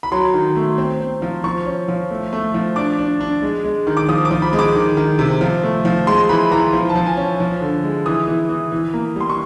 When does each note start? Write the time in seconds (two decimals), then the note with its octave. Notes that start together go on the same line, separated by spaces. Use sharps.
0.03 B5
0.12 F#3 C6
0.34 D#3
0.56 A3
0.78 C4
1.00 C4
1.22 F3
1.44 F3 C#6
1.66 C#4
1.88 F3
2.10 A3
2.33 A3
2.54 F3
2.76 D4 D6
2.98 D4
3.21 D4
3.42 G#3
3.64 G#3
3.87 D#3
3.97 D6
4.08 F3 D#6
4.25 D6
4.31 F3
4.42 B5
4.53 G#3
4.59 D6
4.75 D#3
4.97 D#3
5.19 C3
5.41 F3
5.63 A3
5.85 F3
6.07 G#3 C6
6.29 E3 B5
6.51 E3 A#5
6.73 F3
6.89 A5
6.95 F3
7.06 G#5
7.17 C#4
7.40 F3
7.61 D3
7.84 G#3
8.06 E3 D#6
8.28 E3
8.49 E3
8.72 E3
8.94 A#3
9.16 G3 C6
9.29 C#6